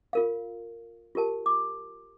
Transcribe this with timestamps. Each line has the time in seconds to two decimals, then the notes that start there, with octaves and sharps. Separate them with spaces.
0.13 F4 A#4 F5
1.15 F4 G4 A#4 A5
1.46 D6